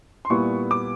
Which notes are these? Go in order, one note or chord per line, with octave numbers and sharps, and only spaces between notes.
C6
A#2 G3 B3 E4 C#6
D6